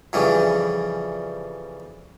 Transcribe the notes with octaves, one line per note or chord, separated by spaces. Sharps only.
F2 C#3 E3 G3